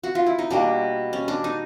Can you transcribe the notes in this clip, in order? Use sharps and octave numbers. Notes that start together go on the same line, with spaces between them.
F#4
F4
E4
D#4
B2 G3 A#3 D4
C#4
D4
D#4